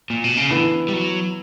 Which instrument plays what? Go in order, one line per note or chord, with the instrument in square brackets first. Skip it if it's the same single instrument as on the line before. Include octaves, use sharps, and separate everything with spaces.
[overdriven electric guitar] A#2
B2
C#3
[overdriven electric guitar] D3 [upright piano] E3 B3 E4
[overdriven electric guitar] G3
F#3